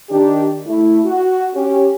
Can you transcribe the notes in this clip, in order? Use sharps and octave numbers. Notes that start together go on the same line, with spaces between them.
D#3 D4 G4
A3 E4
F#4
C#4 G4